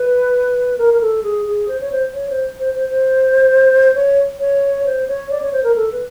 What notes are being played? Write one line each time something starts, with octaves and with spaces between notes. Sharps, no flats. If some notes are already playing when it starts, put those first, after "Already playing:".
Already playing: B4
A#4
A#4
A4
G#4
G#4
C5
C#5
C5
C#5
C5
C5
C5
C5
C#5
C#5
C5
C#5
D5
C#5
C5
A#4
A4
B4